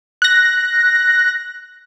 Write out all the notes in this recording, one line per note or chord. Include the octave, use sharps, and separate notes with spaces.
F#6 A#6